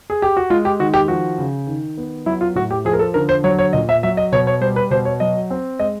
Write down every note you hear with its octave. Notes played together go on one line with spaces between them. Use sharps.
G#4
G4
F#4
G#3 F4
G4
D#3 F#4
G4
F3 F#4
C#3
D#3
B3
F#3 E4
F4
A2 F#4
G4
F3 G#4
A#4
A4
D3 A#4
C5
F#3 C#5
C#5
A#2 D#5
E5
F#3 E5
D#5
B2 C#5
C#5
G3 C5
B4
B2 C5
C#5
F#3 D#5
C4
G#3 D#5